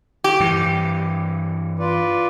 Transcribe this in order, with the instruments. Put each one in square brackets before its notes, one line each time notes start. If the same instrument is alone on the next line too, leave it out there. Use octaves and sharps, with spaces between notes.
[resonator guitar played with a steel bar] G4
[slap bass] G2 E3
[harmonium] F4 B4 D5